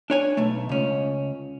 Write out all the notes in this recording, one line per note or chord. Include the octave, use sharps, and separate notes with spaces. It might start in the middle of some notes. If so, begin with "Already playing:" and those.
D4 C#5 G#5
B1 A3
C#2 C#4